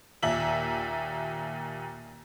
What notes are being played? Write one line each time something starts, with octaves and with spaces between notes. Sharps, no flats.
D#2 A#2 E5 F#7